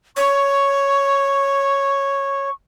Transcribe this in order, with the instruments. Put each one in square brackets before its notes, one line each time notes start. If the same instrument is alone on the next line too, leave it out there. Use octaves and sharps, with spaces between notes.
[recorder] C#5 [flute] C#6